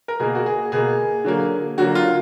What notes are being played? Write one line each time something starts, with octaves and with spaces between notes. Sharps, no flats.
A#4
B2 A#3 G#4
F#4
G#4
B2 A#3 G#4
D3 F#3 A#3
D3 F#3 A#3 F#4
F4